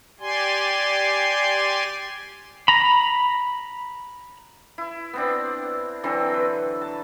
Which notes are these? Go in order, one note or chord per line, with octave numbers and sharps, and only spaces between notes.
G4 D5 G#5 C6
A#5 B5
E4
B3 C4 D4
D3 E3 F#3 C4
B4
A5